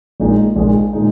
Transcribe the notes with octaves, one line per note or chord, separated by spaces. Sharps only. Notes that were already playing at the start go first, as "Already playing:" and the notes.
A#1 A#2 G#3 D#4
A#1 A#2 G#3 D#4
A#2 G#3 D#4